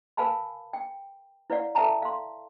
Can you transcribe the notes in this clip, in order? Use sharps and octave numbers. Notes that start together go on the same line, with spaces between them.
A#4 B4 F5 G#5 A5 B5
G5
E4 B4 C#5 D5 F5 F#5
A4 B4 E5 G5 A5 A#5
F5 C6